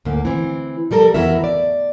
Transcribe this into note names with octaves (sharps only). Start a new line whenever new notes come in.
D2 G#2 A#3
E3 C4
F3 G3 A4 A#4
F2 E3 B3 F#4 A#4 E5
D5